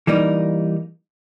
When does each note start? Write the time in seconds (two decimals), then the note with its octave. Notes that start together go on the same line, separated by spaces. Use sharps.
0.07 E3 G3 A#3 D#4